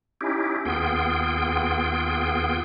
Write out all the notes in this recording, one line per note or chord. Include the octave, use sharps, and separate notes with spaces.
C#4 D#4 E4 G4
D#2 B3 F4 G#4 G5